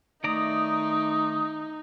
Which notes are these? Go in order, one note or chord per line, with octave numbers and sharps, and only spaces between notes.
D#3 A3 D#4 D5 A#5 D#6